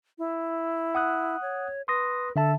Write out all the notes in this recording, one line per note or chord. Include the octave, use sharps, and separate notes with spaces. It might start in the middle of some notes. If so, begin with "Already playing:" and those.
E4
F#5 D#6 F#6
C#5
B4 C6 D#6 A#6
D3 A4 E5 A5